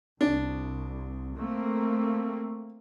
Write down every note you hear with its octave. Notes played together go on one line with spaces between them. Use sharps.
C2 D4
A3 A#3 C4